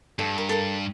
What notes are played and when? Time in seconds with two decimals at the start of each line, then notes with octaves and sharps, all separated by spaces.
0.19 G2 A4
0.38 A#4
0.49 A4 A#4